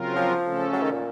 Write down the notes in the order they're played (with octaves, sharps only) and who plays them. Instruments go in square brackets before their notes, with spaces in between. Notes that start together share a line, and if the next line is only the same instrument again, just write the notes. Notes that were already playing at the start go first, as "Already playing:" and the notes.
Already playing: [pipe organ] C#3 F#3 C4 F4 A#4
[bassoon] F3
[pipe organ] C#3 A3 C#4 A4
[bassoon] F#3
D#3
A#2